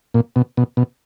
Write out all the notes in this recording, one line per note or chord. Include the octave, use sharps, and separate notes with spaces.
A#2
B2
B2
B2